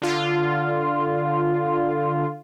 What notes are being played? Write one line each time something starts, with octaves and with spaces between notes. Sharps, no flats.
D3 F4